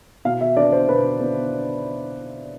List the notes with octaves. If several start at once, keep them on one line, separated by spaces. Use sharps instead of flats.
B2 F5
E5
B3 D4 D5
C5
B2 B4
B3 D4